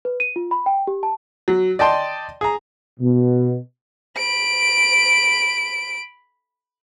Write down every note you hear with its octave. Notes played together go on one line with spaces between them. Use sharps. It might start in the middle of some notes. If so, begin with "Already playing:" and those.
B4
D#7
F4
B5
G5
G4
A5
F#3
D5 D#5 G5 A5 C6
G#4 A#5
B2
B5 D7